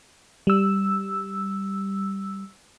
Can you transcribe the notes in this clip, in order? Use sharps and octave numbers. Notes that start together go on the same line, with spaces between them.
G3 E6